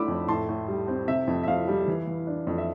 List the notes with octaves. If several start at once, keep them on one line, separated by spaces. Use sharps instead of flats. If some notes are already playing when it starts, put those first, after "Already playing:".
Already playing: A3 D4 B5 D6 E6
F2
A2 A5 C6
A2
G3
C4
C3 E5
F2
E5
F2 F5
G3
E3
E3
D4
F2
E5